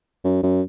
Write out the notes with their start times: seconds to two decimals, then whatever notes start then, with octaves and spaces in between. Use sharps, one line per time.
0.24 F#2
0.43 F#2